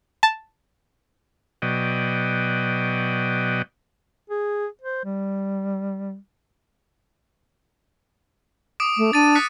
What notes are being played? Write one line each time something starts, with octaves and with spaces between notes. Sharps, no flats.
A5
B2 F#3 D5 D#5 G5
G#4
C5
G3
D6 D#6 D7
A3
D4 A6 D#7
F#6 B6 C#7